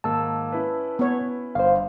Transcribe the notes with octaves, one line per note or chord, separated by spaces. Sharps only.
G#2 D#3 A#3 A5 E6
C#4 E4 B4
B3 C#5
G1 C5 F5